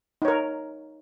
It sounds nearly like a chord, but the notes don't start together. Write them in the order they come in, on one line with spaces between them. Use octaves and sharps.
D#4 C#5 A#4